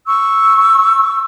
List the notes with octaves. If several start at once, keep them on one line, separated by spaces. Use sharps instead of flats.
C#6 E6